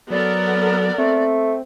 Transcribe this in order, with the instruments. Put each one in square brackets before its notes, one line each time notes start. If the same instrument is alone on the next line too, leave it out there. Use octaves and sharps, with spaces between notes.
[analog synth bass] F#3 [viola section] B3 A4 A#4 [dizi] D5
[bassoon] A3 [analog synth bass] C4